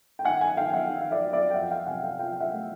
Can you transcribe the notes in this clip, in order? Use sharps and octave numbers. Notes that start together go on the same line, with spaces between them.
G5
D#3 F#5 G#5
F#5 G#5
D#3 F5 G5
E5 F#5
D#3
F5
D5 E5
F#3
D5 E5
G5
F2 E5 F#5
F5 G5
C3 F#5 G#5
F5 G5
F3 F5 G5
E5 F#5
A3